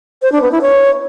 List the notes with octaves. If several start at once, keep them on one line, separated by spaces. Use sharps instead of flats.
C5
D4
B3
E4
C#5